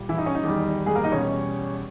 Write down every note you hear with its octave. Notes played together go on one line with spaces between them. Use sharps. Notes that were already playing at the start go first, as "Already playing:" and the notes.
Already playing: A#2 G3
E3 E4
D#4
C#4
D#4
E2 D#3 G3
G#3 G#4
A#3 A#4
D#4 D#5
E2 B2 G3 C#4 C#5